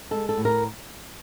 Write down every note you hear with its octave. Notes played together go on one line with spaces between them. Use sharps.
G#3 A4
A4
A2
A#4